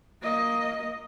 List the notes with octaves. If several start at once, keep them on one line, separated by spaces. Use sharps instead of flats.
A#3 D#5